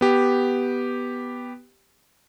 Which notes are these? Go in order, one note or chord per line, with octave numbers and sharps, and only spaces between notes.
B3 G4